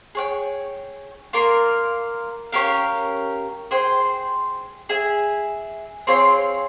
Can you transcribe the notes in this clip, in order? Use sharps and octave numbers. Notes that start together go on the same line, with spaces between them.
G#4 C#5 G5
A#3 F4 A#4
C#4 G4 A#4 F5
G#4 C5 G5
G#4 E5 G#5
C4 F4 G#4 C#5